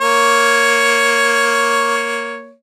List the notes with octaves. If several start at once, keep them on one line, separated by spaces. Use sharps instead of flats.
A#3 C#5